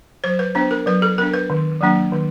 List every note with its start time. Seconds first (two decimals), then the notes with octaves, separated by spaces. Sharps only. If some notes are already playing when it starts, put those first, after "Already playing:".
0.24 F#3 C5
0.39 B4
0.55 B3 D4 C5
0.71 A#4
0.86 F#3 B4
1.02 A4
1.18 B3 D4 A#4
1.34 B4
1.50 D#3
1.81 F#3 A#3 D4
2.12 D#3